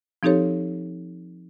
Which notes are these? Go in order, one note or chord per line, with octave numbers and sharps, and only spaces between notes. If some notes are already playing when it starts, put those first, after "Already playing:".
F3 C4 D#4 G4 A4 C#5